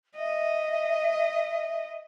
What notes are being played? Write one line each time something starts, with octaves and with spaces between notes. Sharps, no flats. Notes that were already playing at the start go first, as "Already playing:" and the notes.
D#5 E5